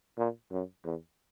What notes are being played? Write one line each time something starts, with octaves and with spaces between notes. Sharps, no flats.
A#2
F#2
E2